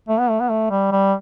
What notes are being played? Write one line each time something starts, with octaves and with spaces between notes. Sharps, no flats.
A3
B3
A3
B3
A3
G3
G3